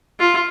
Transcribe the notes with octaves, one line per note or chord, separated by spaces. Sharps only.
F4